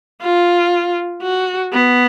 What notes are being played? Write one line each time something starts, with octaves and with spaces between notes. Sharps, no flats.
F4
F#4
B3